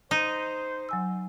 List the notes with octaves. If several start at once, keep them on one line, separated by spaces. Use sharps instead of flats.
D#4 C5
F#3 G#5 E6